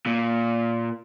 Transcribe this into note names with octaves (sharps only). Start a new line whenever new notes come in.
A#2